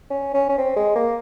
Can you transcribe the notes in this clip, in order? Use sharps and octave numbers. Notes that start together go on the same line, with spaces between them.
C#4
C#4
C#4
C4
G#3
A#3